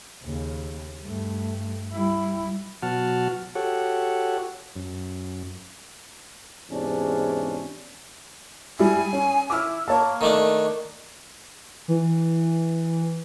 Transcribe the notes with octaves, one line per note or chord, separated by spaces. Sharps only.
D#2 C#3
G2 A3
G3 E4
B2 F#3 F#4 F#5 A5 F6
F#4 G4 A4 C#5 F#5
F#2
E2 G#2 C3 C#4 D4
G3 E4 G#5
C#4
E4 D6 F6
A#3 C#5 A5
D#3 A3 D4
E3